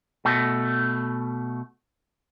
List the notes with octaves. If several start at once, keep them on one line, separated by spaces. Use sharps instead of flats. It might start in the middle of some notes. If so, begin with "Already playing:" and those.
B2 A3